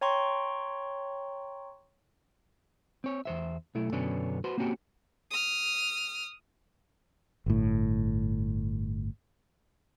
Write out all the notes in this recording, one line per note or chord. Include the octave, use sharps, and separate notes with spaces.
C#5 G5 A#5 C6 C#6
C4 C#5
E2 C5 E5
B1 A3 E4
F#2 B2 D3 B3 C#4 D4
F#4 B4 C5
A#3 C4 C#4 F#4 G4
D#6 F6
G1 A2